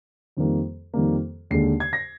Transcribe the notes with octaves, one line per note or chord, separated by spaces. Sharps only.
F2 D#3 G3 A#3
F2 D#3 G3 A#3
D#2 D3 G#3 C7
G#6
A#6